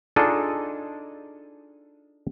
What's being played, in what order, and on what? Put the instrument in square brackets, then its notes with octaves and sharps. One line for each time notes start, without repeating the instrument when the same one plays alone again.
[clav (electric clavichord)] D4 D#4 F4 G#4 A4 D#5